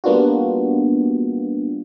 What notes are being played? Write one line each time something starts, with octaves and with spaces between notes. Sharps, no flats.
G3 A#3 B3 D4 F4 F#4